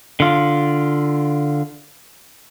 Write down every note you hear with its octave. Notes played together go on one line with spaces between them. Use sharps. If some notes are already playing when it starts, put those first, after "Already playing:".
D3 F4